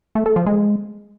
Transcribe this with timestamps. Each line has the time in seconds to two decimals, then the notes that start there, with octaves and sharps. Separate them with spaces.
0.15 A3
0.26 A4
0.36 F3
0.46 G#3